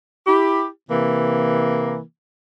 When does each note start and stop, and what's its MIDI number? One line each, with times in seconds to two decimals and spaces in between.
0.27 0.66 64
0.27 0.66 67
0.90 2.00 48
0.90 2.00 52
0.90 2.00 58